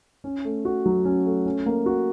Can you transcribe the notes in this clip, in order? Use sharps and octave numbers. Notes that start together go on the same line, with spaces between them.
C#4
A3
F#4
F#3
C#4
A3
C#4
A#3
F#4